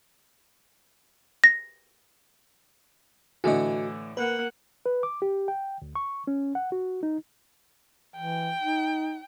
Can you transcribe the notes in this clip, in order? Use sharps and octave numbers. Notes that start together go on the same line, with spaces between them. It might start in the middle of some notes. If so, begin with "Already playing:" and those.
A#6
A2 D3 E3 F#4 D#5
A#3 B4 F#5
B4
D6
G4
G5
D2
C#6
C#4
F#5
F#4
D#4
E3 G5
D#4